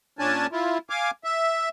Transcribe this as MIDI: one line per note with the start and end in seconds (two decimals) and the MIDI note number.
0.19 0.47 46
0.19 0.47 61
0.19 0.47 62
0.19 0.47 74
0.19 0.47 80
0.19 0.47 81
0.52 0.78 64
0.52 0.78 65
0.90 1.11 77
0.90 1.11 80
0.90 1.11 86
1.24 1.69 76